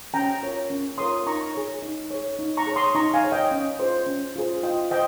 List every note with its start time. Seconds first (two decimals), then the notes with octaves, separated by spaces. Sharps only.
0.14 C#4 G5 A#5
0.42 F4 A#4 C#5
0.70 C#4
0.98 F4 A#4 C#5 C6 D#6
1.26 D#4 A#5 C#6
1.54 G#4 C#5
1.82 D#4
2.11 G#4 C#5
2.39 D#4
2.57 A#5 C#6
2.67 G#4 C#5
2.76 C6 D#6
2.95 D#4 A#5 C#6
3.14 F5 G#5
3.23 G#4 C#5
3.32 D#5 G5
3.51 C#4
3.79 F4 G#4 C5
4.07 C#4
4.36 F4 G#4 C5
4.63 F4 D#5 G5
4.91 C5 D#5 G5